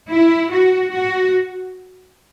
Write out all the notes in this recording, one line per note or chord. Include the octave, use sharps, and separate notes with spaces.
E4
F#4
F#4